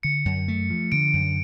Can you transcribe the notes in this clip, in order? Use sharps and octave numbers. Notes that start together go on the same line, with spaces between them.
D3 C#7
F#2
A3
F3
D3 D7
F#2